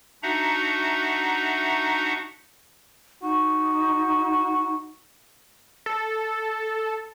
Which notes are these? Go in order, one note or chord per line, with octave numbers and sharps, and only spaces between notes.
D4 D#4 F#4 E5 F#5 A#5
D#4 F#4
A4